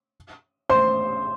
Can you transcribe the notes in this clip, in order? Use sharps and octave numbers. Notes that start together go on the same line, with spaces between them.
C5 C6